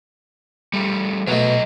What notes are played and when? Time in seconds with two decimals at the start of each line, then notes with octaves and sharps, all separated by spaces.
0.73 G3 A3
1.28 B2 F#3 A3 D#5